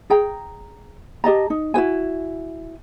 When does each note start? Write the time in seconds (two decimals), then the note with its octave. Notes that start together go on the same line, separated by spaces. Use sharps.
0.10 G#4 G5 A#5
1.24 G4 D#5 A5 A#5
1.50 D#4
1.74 E4 F#4 C5 G#5